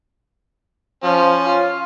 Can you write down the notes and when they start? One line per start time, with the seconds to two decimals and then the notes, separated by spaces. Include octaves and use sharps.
1.03 F3 C#4
1.46 F4